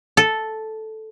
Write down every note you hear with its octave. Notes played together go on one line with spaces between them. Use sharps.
A4